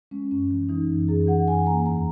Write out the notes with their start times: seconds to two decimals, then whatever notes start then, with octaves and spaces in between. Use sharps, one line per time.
0.11 G#3 C#4
0.31 F#2 C#4
0.51 E3
0.69 E3 D#4
0.90 F#2
1.08 F#2 G#4
1.27 E3 F#5
1.47 F#2 G#5
1.66 A#3 A#5
1.86 E2 A#5